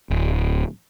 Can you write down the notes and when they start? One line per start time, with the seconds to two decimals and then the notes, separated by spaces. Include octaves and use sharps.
0.10 D1